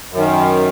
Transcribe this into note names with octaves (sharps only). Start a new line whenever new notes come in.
F#2
D#3